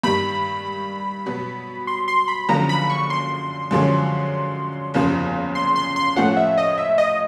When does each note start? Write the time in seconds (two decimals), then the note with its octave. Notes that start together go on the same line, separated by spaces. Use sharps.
0.04 G2 D#3 G3 B5
1.26 B2 F#3 B3
1.87 C6
2.08 C6
2.28 B5
2.49 F#1 F#2 D3 F3 A#5
2.69 B5
2.90 C#6
3.10 C6
3.71 F#2 D3 F3 G#3 C#4
4.94 F#1 E2 C#3 F3
5.55 C6
5.76 C6
5.96 C6
6.16 A2 F3 A3 C#4 F4 F#5
6.37 E5
6.58 D#5
6.78 E5
6.98 D#5